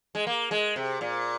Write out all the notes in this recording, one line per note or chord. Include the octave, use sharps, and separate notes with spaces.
G#3
A#3
G#3
C3
A#2